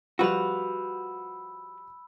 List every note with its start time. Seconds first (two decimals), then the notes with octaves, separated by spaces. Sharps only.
0.19 F3 G3 F#4 B4 B5 E6